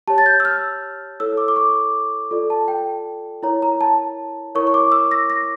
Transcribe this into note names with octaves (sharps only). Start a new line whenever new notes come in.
G4 C#5 A5
A6
G6
E6
F6
E4 A4 C#5 E6
D6
D6
C#6
F4 A4 D5
A5
G5
E4 A#4 C#5 A#5
A#5
A5
E4 A#4 C#5 C#6
C#6
D6
E6
A#6
A#6